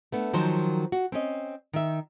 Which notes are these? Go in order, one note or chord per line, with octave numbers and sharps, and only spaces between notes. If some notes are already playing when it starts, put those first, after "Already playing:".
A3 B3 D4
D#3 F3 F#3 C5
F#4
C4 C#4 D#5
D#3 E5